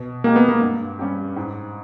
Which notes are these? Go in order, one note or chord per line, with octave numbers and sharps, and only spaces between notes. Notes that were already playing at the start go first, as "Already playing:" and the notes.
Already playing: B2
G#3 A#3 D#4 G4
B3
A#3
G2
G3 C#4 G4
G#2